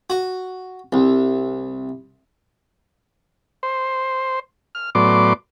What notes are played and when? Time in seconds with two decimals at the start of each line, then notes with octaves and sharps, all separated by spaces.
0.10 F#4
0.93 C2
3.63 C5
4.75 F6
4.95 A2 F#3 B3 D5 C6 D6